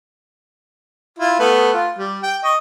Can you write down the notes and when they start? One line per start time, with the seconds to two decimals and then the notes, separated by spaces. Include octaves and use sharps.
1.19 E4 F4
1.40 A3 B3 B4
1.74 F4
1.98 G3
2.23 G5
2.44 D#5 C#6